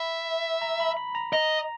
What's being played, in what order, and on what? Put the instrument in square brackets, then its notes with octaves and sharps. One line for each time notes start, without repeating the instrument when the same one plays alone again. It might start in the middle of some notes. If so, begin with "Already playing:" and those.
Already playing: [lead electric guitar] E5 [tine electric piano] B5
[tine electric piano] A#5
B5
B5
A#5
[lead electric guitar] D#5 [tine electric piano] A#5